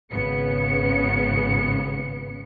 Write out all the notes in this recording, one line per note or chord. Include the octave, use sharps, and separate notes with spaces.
G#1 C#3 B3 C#7